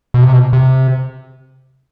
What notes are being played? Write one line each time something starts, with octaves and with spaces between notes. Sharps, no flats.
B2
C3
B2
C3